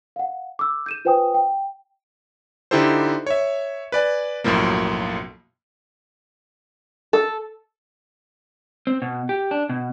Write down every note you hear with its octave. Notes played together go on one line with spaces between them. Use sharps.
F5 F#5
D6 E6
G6 D#7 E7
F4 B4 C5 G5 G#5 D#6
G5
D3 D#4 E4 G4 A4 C5
C#5 E5
B4 D5 G#5
B1 F#2 A2 F3 A#3
A4
C4
B2
G4
D4
B2